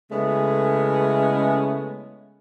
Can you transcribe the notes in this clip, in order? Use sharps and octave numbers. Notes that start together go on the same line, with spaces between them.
C#3 G#3 A3 B3 C#4 E4